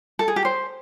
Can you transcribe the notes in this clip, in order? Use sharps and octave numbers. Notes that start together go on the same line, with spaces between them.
A4
G#4
G4
C5